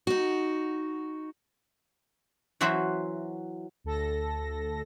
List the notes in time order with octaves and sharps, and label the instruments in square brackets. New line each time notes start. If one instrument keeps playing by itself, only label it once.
[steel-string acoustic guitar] D#4 F#4
[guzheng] E3 F#3 F#4 C5 E5
[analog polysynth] D2 A4 A#6